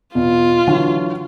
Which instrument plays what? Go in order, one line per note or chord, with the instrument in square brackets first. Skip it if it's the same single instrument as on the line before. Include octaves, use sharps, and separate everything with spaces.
[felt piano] E2 B2 [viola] F4
[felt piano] D3 E3 F#3